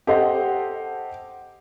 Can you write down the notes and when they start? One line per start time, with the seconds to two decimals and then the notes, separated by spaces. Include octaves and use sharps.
0.07 G4 A4 C5 D#5 F#5